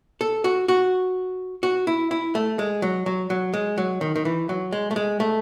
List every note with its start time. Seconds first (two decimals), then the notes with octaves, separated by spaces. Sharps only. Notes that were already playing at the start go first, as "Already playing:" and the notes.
0.21 A4
0.44 F#4
0.68 F#4
1.63 F#4
1.87 E4
2.11 E4
2.35 A3
2.59 G#3
2.82 F#3
3.06 F#3
3.30 F#3
3.54 G#3
3.78 F#3
4.01 D#3
4.16 D#3
4.25 E3
4.49 F#3
4.73 G#3
4.91 A3
4.96 G#3
5.20 A3